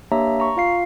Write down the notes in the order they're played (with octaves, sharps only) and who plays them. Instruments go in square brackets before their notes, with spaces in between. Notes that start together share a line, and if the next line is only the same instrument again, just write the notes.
[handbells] A#3 D4 G4 C#5 E5 A#5
A#5 C#6
F4 F5 C7